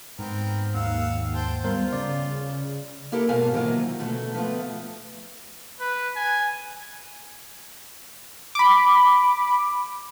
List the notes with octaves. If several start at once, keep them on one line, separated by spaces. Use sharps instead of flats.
G#2 B3 C4 A#4
D#2 F5 F#5 E6
C5 G5 A5
G3 B3 F4 A#4 C5
C#3 D5
A#3 E4 G4 A4 A#4
G#2 B2 A#4 F5 G#5 A5
C3 D#3 E3 F#3 A#3 F4
B2 D3 A3 F#4 A4
F3 A3 B3 F4
B4
G#5
B5 D6